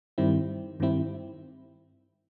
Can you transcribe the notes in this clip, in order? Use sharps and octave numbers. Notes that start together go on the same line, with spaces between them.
G2 D#3 G3 C4 E4
G2 D#3 G3 C4 E4